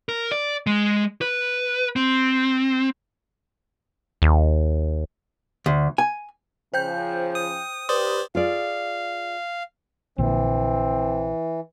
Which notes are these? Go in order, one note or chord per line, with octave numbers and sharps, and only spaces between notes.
A#4
D5
G#3
B4
C4
D#2
D2
G#5
C#3 F3 C5 G5 G6
D#6
G4 B4 C5 D5 D#6
F4 G#4 D5 F5
A#1 A#2 D3 E3 C4